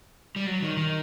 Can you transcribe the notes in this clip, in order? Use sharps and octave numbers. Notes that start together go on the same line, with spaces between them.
G3
F#3
D#3
D#3